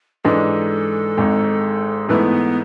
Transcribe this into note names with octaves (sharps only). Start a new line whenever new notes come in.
G#2 E3 G#3 D4 A4
G#1 G#2 G#3
G#2 E3 A3 B3 E4 B4